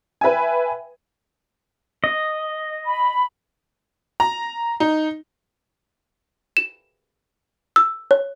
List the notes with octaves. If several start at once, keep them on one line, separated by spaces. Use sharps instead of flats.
B4 E5 G5 G#5
D#5
B5
A#5
D#4
E7
E6
C#5